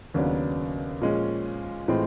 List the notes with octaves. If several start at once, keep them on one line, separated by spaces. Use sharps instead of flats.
D#2 C#3 F#3 B3 D4
A#2 F3 G#3 C#4
A2 E3 G#3 C4 F4